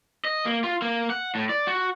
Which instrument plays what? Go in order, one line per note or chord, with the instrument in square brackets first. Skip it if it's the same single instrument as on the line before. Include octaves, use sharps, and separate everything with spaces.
[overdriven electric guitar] D#5
A#3
F4
A#3
F#5
A2
D5
F#4